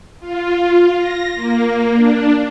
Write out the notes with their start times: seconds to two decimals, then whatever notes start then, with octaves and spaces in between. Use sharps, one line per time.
0.20 F4
0.98 A#6
1.36 A#3
1.94 D4